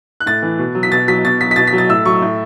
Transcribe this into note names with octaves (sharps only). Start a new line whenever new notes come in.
F#6
A2 A6
E3
B2
F#3
B6
B2 A6
F#3 B6
B2 A6
F#3 B6
B6
B2 A6
B6
F#3
A6
A2 E6
F#3 C#6
A2